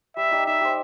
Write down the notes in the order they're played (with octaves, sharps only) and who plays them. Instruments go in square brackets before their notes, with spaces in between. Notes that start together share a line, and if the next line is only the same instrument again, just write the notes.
[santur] G3 [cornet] E5
[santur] D#4 G4
[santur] D#4 [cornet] E5
[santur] G4 C5